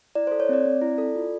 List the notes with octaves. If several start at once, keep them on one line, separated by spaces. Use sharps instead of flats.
E4 D5
A4 C5
C#5
C4 D5
C4
E4
A4
F4